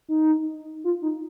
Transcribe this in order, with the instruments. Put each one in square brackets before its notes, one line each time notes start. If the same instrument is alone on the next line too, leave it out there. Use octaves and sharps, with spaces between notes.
[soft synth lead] D#4
F4
D#4